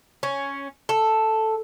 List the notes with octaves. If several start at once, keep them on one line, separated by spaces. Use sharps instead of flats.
C#4
A4